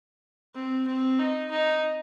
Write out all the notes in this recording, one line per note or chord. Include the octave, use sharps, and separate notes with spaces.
C4
C4
D#4
D#4